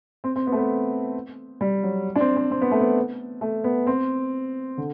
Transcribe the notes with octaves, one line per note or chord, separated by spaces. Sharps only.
C4
C4
B3
A3
B3
G3
F#3
D4
C4
C4
C4
B3
A3
B3
A3
B3
C4
D3